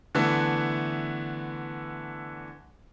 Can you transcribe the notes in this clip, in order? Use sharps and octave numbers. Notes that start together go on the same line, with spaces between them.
D3 E3 A3 B3